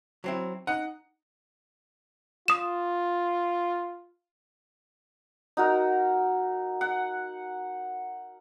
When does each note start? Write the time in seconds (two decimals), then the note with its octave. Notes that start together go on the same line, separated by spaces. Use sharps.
0.24 F#3 C4 E4
0.67 D#4 F#5
2.48 F4 D#6 E7
5.57 D#4 F#4 A#4
6.81 F#5